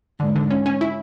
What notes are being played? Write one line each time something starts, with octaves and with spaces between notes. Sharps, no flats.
G#2 D3
D3
C#4
C#4
E4